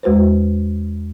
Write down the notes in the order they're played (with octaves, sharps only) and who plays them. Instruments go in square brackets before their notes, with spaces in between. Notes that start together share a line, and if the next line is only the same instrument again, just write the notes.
[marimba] E2 G#3 F#4 B4 C5